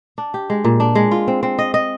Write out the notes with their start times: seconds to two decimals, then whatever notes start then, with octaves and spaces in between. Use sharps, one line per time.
0.18 D4
0.34 G4
0.50 G#3
0.65 A#2
0.80 D4
0.95 G#3
1.11 F4
1.28 C4
1.43 C4
1.59 D#5
1.74 D#5